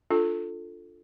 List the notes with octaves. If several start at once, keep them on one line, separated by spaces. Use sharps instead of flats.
D4 F4 A4